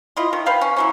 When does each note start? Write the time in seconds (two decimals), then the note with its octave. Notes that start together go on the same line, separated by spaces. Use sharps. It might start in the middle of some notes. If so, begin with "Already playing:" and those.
0.17 E4 F4 D#5
0.33 D#3
0.46 B4 F5 G5
0.61 C#4
0.76 E3 F#3 C#4